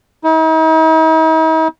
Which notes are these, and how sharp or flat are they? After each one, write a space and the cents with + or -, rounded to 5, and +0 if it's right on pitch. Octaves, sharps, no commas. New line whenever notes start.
D#4 +45